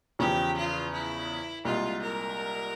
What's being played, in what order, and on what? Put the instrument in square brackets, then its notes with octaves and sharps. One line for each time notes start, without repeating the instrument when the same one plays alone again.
[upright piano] E2 C#3 F3 [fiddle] G4
[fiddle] F4
E4
[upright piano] C2 A#2 G#3 [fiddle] F4
[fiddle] A#4